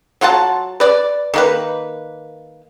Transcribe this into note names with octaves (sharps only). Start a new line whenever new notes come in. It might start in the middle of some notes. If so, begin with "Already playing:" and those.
F#3 F4 F#5 A5
B4 D5
D#3 A#3 B4